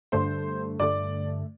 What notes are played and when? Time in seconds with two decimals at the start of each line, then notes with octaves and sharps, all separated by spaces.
0.12 G2 D3 A3 C5 C6
0.80 G2 D3 A3 D5 D6